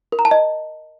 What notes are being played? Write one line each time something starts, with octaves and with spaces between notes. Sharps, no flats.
A#4
A#5
A5
D#5